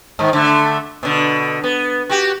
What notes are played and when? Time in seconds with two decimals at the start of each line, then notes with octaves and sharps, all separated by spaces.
0.19 G#2 D#3
0.33 D3 A3
1.03 B2 D3
1.63 B3
2.09 F#4 G4